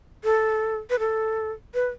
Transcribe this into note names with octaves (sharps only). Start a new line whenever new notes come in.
A4
B4
A4
B4